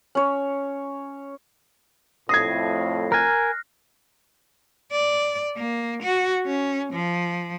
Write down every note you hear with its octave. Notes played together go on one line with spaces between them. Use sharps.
C#4 C#5
F2 A2 D#6 G#6 A#6 C7
A#4 G#5 F6 F#6 A#6
D5
A#3
F#4
C#4
F3